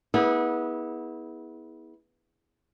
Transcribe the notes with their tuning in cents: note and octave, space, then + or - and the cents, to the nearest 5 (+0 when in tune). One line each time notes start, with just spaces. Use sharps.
B3 -20 E4 -35 G#4 +0